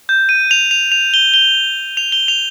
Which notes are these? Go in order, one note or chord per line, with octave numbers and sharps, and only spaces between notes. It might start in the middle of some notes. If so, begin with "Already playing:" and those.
G6
D#7
F7
F7
F7
G7
G7
F7
G7
F7